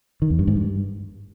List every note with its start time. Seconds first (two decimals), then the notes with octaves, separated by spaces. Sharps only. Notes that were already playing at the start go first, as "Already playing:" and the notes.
0.22 D#3
0.30 E2
0.39 G2
0.47 G#2
0.56 G2